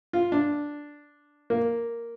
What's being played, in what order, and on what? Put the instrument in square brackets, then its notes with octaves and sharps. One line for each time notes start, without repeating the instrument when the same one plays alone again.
[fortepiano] F4
D4
A#3